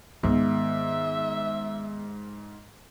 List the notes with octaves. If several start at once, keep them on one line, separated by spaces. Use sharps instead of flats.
G#2 D#3 B3 E5